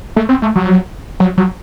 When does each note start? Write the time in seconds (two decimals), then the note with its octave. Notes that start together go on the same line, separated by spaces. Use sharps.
0.16 A3
0.29 C4
0.42 A3
0.56 F#3
1.20 F#3
1.38 F#3